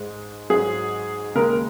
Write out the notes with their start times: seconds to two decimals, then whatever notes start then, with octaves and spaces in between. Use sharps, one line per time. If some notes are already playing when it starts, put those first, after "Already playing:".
Already playing: G#2 G#3
0.50 G#2 F#3 G#4
1.35 D#2 C#3 G#3 A#4